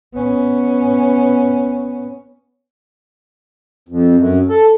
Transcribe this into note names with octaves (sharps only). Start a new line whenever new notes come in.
B3 C#4
F2
F#2
A4